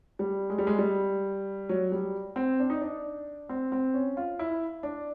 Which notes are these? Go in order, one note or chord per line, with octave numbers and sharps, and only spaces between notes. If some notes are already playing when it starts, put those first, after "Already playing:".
G3
G#3
G3
G#3
G3
F#3
G3
C4
D4
D#4
D4
C4
C4
C#4
F4
E4
D4